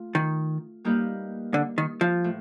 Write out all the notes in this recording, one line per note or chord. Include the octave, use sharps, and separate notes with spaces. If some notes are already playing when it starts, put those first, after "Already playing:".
Already playing: A3 F4
D#3
G3 A#3 D#4 G4 B4
D3
D#3
F3
A2